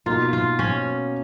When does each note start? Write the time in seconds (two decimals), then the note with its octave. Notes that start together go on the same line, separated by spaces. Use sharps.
0.06 B2 A#3 D#4 F4
0.33 F4
0.59 C#4